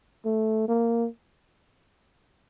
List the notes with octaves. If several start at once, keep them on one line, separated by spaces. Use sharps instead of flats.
A3
A#3